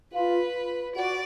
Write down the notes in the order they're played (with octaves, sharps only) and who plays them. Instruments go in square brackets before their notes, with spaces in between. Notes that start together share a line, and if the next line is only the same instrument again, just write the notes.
[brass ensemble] F4 [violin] B4
[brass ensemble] F#4 [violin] D5